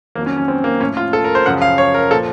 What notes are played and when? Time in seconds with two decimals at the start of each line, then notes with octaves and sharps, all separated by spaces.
0.15 F2 D#3 F#3 A#3
0.26 C#4
0.37 C#4
0.48 C4
0.64 A#3
0.80 A2 F3 C#4
0.97 F4
1.13 A4
1.24 A#4
1.35 C5
1.46 F#2 C#3 F3 F#5
1.62 F5
1.78 C#5
1.94 A#4
2.11 A#2 F3 A4